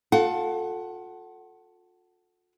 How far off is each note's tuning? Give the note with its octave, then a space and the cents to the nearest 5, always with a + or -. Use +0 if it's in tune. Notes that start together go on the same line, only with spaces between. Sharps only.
F4 +40 A4 +0 F#5 +25